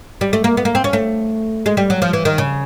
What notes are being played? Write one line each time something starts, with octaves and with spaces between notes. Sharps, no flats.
G3
A3
A#3
B3
A#3
C4
C#4
A3
G#3
G3
F#3
F3
E3
D#3
C#3